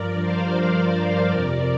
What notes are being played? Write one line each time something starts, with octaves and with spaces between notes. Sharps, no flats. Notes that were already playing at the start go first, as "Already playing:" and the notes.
Already playing: G2 F3 A#4 D5
C5 F5
A#4 D5
F2 C3 F3